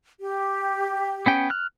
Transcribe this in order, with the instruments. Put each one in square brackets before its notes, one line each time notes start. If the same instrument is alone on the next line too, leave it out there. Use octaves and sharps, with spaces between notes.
[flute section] G4
[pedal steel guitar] B3 C#4 G5
F6 F#6